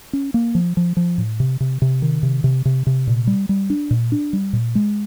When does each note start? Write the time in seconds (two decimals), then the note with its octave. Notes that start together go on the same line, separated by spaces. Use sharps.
0.13 C#4
0.34 A#3
0.55 F3
0.77 F3
0.97 F3
1.18 A2
1.40 C3
1.60 C3
1.82 C3
2.02 D#3
2.23 C3
2.44 C3
2.65 C3
2.87 C3
3.07 A#2
3.27 G3
3.49 G3
3.70 D4
3.91 A#2
4.12 D4
4.33 G3
4.53 A#2
4.75 G#3